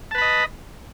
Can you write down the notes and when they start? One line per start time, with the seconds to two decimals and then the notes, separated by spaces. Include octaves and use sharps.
0.11 A5
0.15 B4
0.18 B5
0.22 D#5